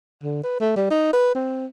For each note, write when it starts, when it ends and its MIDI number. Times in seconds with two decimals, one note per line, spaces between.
0.23 0.42 50
0.43 0.59 71
0.60 0.72 57
0.76 0.90 55
0.91 1.12 63
1.13 1.33 71
1.35 1.66 60